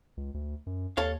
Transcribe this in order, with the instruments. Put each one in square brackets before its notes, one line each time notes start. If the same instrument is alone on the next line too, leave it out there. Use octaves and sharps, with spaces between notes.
[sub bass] C#2
D2
F#2
[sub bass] D#2 [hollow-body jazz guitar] A4 C#5 F5